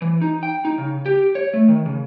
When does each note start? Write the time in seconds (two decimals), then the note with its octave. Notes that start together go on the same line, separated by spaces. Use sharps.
0.02 E3
0.21 D#4
0.43 G5
0.65 D#4
0.78 C#3
1.06 G4
1.35 C#5
1.53 A3
1.68 D#3
1.86 C#3